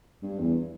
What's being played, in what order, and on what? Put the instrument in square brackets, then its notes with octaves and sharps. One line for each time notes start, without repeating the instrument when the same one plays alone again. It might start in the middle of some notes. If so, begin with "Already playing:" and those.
[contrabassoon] G2
E2